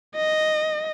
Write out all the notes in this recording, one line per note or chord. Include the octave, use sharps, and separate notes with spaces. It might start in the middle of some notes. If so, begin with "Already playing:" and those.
D#5